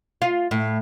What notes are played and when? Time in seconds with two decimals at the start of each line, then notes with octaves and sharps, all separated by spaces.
0.22 F4
0.51 A2